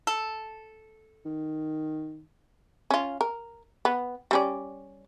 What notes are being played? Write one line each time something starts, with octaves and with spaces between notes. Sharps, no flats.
A4
D#3
C#4 F4
A#4
B3
G3 C#4 D5